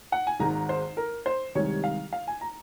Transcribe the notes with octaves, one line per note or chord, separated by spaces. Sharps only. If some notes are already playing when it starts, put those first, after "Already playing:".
F#5
G#5
G#1 G#2 D#3 G#3 A#5
C5
A#4
C5
C2 C3 D#3 G#3 C#5
F5
F5
G#5
A#5